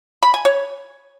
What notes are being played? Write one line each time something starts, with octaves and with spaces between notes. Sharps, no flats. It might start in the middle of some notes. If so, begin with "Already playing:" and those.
B5
G#5
C#5